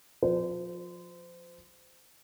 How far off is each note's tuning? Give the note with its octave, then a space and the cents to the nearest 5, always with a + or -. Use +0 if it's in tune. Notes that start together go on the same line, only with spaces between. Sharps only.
F3 +25 C5 -30